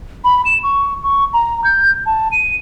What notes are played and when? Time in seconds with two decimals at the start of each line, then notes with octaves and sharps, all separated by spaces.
0.24 B5
0.45 E7
0.63 C#6
1.03 C#6
1.33 A#5
1.64 G6
2.06 A5
2.32 D#7